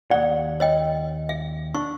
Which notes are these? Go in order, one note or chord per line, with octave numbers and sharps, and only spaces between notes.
D#2 D5 F#5
C#5 D#5 G5
E5
D4 C#6